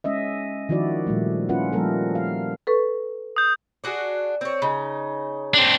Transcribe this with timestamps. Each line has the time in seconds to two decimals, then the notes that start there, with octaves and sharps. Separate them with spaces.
0.04 G#3 C#4 D#5 E5
0.69 D#3 F3 E4 F#4 D5
1.07 A#2 F3 G3 A3
1.49 C#4 E4 F4 B4 F#5
1.73 F3 G3 A#3 A4 A#4
2.15 F5
2.67 A4 B4 C#6
3.36 D#6 G6
3.84 D4 F#4 G#4
4.41 C4 C#5
4.62 C#3 D#4
5.54 C4 D4